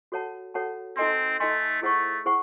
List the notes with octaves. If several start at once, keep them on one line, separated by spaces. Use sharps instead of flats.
F#4 A4 C#5 F#5 A5
F#4 A4 C#5 F#5 A5
C4 D#4 A4 D#5 G#5 C6
A3 D#4 A4 D#5 G#5 C6
A3 E4 G#4 C5 F#5 C#6
E4 G#4 C5 F#5 C#6